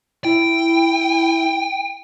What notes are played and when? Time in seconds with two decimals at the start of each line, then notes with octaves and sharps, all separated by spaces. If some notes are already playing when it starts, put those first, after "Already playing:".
0.25 E4 G5